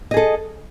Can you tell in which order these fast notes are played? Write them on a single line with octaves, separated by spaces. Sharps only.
D#5 G#4 A4